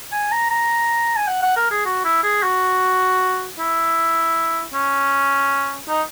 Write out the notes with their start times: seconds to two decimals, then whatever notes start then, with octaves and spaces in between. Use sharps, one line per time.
0.12 G#5
0.32 A#5
0.50 A#5
1.16 G#5
1.27 F#5
1.42 F#5
1.56 A#4
1.70 G#4
1.85 F#4
2.04 E4
2.23 G#4
2.43 F#4
3.59 E4
4.74 C#4
5.89 D#4